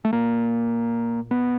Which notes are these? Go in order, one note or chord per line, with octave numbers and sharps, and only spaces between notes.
A3
A#2 A#3
B3